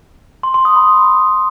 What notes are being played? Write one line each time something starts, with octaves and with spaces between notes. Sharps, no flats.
C6
C6
D#6
B5